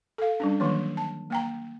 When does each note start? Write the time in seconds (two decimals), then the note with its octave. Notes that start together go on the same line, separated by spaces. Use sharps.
0.18 A4 F5
0.40 G3 C#4 D4
0.60 D#3 E3 F#3 A#3 C#5
0.97 A5
1.30 A#3 G5 A#5